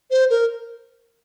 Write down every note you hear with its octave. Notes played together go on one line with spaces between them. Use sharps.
C5
A#4